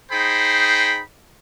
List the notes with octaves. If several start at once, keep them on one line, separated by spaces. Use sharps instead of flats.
D#4 G#4 C5 G5 B5